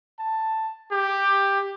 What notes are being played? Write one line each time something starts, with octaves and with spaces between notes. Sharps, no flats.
A5
G4